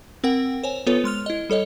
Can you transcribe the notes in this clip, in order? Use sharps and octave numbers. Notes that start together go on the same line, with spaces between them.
C4 A#4 F#5 G5
C5 C#5 G#5
B3 F4 A4 B4 C#5
G#3 C6 F6 F7
E4 D#5
G3 A4 C#5 D#5